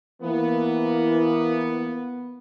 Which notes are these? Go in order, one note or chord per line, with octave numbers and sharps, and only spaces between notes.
E3 A#3 B3